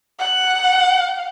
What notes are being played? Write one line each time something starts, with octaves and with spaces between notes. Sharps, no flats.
F#5